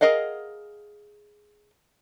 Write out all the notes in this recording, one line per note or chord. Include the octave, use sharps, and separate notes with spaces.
G#4 A#4 D#5 F5 F#5